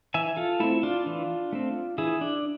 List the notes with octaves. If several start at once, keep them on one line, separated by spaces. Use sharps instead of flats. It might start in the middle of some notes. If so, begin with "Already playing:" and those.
E3 E5 G#5
F4 A4
A3 C4 E4
D4 F4
E3
A3 C4
E3 E4 G#4
D4